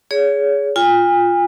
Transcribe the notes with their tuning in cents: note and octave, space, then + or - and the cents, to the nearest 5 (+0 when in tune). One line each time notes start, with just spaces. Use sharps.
G#4 +0 C#5 +30
F4 +5 G#5 -40